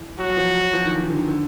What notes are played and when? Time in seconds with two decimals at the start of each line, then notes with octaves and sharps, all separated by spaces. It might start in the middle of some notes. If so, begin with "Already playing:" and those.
Already playing: E3
0.18 F#3 F#4
0.30 F#3
0.37 F3
0.55 F#3
0.73 F3
0.86 D#3
0.92 E3
1.01 D#3
1.10 D3
1.19 D#3
1.28 D3